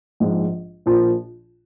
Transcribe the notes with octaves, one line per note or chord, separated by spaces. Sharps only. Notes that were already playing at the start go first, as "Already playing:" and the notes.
A#1 G#2 G#3
A#1 A#2 F3